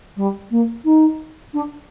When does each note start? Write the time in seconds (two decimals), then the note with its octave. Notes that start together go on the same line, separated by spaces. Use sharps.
0.16 G3
0.50 A#3
0.84 D#4
1.53 D4